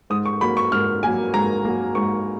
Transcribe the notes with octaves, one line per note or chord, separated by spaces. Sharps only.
G#2 D#6
C#6
F#3 A#3 B5
C#6
G#2 F6
F#3 A#3 G#5
G#2 A#5
F#3 A#3
G#2 C#6